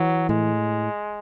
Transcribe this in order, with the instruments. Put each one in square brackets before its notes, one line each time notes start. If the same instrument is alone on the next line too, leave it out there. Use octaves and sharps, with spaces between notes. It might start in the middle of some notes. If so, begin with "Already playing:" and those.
Already playing: [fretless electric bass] E3 [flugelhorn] F#3
[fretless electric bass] A2 [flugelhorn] G#3